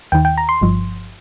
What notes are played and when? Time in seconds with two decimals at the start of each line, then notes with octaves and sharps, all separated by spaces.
0.12 D#2 D#3 G5
0.25 G5
0.38 A#5
0.49 C6
0.61 G1 G2 F3